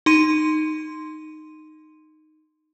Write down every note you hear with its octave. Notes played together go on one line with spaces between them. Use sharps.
D#4 C6 D#7